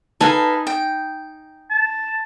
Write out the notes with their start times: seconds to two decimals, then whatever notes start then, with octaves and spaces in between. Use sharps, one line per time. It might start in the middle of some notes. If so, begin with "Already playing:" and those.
0.21 D#4 A4 B4 F5 G#5
0.67 G5
1.70 A5